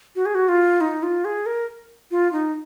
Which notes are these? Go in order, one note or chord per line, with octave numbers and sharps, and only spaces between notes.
F#4
G#4
F#4
F4
D#4
F4
G#4
A#4
F4
D#4